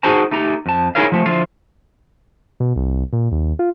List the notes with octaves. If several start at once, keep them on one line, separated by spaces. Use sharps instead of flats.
D#4 F#4 G#4 C5 A5 A#5
A3 D#4 G4 A#5
F2 A5
D#4 E4 G#4 A#4 C#5 F5
F3 A3
D3 F3 E4 F4 F5
B2
C2
A#2
D#2
F4